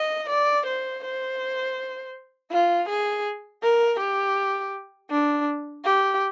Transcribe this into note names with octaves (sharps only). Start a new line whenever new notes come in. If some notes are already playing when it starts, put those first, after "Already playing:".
Already playing: D#5
D5
C5
C5
F4
G#4
A#4
G4
D4
G4